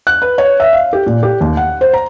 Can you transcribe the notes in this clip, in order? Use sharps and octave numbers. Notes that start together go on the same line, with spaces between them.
F#6
B4
C#5
E5
F5
G4
A#2
G4
D#2
F#5
C5
A#5